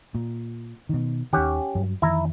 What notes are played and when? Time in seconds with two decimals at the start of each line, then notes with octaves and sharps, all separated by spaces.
0.15 A#2
0.89 B2 D#3
1.33 D#2 D#3 C#4 G4 F#5
1.75 G2 F#3
2.02 F2 D#3 E3 E4 A#5